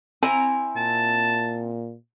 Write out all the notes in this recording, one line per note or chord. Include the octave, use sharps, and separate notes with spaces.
C4 E4 G#5 A#5
A#2 A5